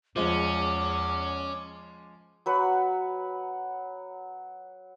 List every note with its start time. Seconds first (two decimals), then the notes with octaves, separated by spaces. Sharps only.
0.16 E2 F3 G#3 C#4 D6
2.46 F#3 B4 F#5